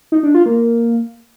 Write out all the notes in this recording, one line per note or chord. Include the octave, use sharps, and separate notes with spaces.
D#4
D4
F4
A#3